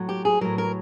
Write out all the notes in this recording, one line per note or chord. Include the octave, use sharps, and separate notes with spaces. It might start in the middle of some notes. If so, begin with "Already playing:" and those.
Already playing: A2 F#3
G4
G#4
A2 F#3 A#4
A#4